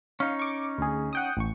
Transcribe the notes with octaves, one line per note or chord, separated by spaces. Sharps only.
C#4 D#4 F5
C#6 D6
D2 G#4
F#5 G5 D#6
A1 C#6